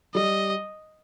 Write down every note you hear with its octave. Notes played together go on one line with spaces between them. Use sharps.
G3 D#5